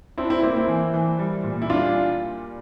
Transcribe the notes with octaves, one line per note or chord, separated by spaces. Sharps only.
C4 D4 E4
C4 E4
A#3 C4 E4
C4 E4
E3
E3
G3
A#2
E4
G3 D4 F4